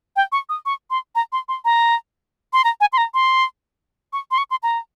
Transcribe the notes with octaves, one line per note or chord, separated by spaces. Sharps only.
G5
C#6
D#6
C#6
C6
A#5
C6
C6
A#5
C6
A#5
G#5
C6
A#5
C6
C#6
C6
C#6
C6
A#5